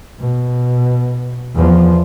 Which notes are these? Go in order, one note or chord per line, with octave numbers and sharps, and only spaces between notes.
B2
E2 F3